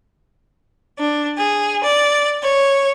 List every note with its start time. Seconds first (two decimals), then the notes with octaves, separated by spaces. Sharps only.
0.98 D4
1.37 G#4
1.83 D5
2.42 C#5